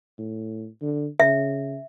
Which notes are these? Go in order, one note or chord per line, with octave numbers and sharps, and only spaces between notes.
A2
D3
C#3 E5